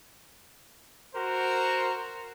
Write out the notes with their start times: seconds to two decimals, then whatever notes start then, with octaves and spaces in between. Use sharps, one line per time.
1.15 F#4 A#4 C5